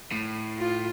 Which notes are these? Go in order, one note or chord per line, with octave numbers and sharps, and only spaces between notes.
A2
F4